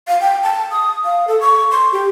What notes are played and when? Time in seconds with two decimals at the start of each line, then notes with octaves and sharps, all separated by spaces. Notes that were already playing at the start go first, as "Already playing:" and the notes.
0.08 F5
0.21 G5
0.43 A5
0.72 D#6
1.04 F5
1.28 A4
1.41 C#6
1.71 C6
1.92 G4